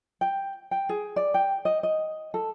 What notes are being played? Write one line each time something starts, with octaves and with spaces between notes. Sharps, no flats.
G5
G5
G#4
D5
G5
D#5
D#5
A4